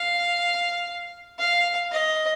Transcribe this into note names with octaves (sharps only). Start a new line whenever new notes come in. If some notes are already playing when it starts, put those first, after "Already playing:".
Already playing: F5
F5
D#5